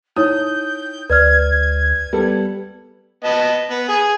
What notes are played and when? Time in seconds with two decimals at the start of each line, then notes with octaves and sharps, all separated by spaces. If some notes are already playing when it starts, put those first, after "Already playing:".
0.16 D#4 E4 C#5 D#6 G6
1.10 D2 B4 D5 F6 G#6
2.13 G3 B3 A4
3.24 B3 D#5 A5
3.71 B3
3.88 G#4 G#5 D#6